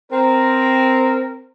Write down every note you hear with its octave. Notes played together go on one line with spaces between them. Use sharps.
C4 A#4